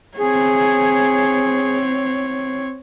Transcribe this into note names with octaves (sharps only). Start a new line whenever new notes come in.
C4 G#4 C#5